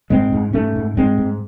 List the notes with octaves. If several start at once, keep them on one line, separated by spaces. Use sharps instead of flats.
G#2 G#3 C4
G#2
G#2 A3 C#4
G#2
G#2 G#3 C4
G#2